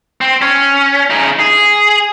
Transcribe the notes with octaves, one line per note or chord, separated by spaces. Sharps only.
C4
C#4
C#3 D#4
G#4